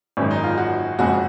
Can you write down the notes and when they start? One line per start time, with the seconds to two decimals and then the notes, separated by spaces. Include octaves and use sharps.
0.17 G#1 F#2 D#3 G#3 C#4
0.31 D#4
0.44 F4
0.58 F#4
0.98 F#1 F2 C#3 G#3 F#4